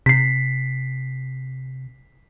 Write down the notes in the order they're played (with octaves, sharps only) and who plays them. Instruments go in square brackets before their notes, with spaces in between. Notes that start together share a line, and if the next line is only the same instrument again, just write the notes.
[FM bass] C3 [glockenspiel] B6 C7